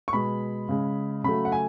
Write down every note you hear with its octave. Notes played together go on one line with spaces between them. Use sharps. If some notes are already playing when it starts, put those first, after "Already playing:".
C#6
B2 G#3 B5
C#3 G#3
C#3 F#3 A3 B5
F#5
G#5